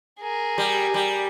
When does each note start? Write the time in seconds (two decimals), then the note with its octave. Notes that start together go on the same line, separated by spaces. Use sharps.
0.20 G#4 A#4
0.58 G3
0.94 G3